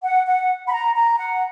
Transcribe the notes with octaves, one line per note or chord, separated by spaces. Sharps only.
F#5
F#5
B5
A#5
A#5
F#5